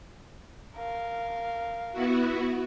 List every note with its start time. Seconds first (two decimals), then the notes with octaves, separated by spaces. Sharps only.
0.77 A#4 F5
1.92 B3 E4 F#4